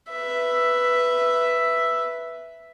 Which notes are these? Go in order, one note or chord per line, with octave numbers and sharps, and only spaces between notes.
B4 E5